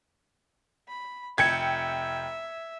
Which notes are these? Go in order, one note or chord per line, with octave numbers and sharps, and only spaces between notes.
B5
F1 E5 G5 G#6 C#7